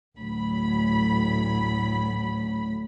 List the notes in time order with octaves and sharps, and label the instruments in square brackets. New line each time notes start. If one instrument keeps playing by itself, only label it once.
[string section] A1 D2 F#3 B5